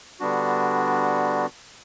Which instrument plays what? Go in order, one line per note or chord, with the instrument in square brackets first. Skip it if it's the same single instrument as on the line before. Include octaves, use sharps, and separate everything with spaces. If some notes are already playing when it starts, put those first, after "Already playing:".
[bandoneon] D3 G3 B3 D4 F#4